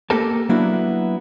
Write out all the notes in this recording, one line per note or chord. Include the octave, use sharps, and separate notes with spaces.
A#3 G4 A4 A#4 A5
F#3 A#3 B3 D4 E4 F#4